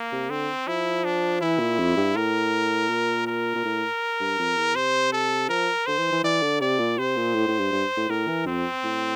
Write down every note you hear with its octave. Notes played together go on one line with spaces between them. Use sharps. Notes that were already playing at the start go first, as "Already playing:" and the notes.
Already playing: A#3
C3
D3 C4
F3 E4
D4
E3 E4
A#2
F2
G2
A2 A#4
A#2
A#4
A#2
A2
G2
F2
E2
C3 C5
A4
F3 A#4
D3 C5
E3
E3
E3 D5
D3
C3 D5
A#2
C3 C5
A#2
A2
A2
G2
G2
A2
A2 A#4
E3
F2 C4
A2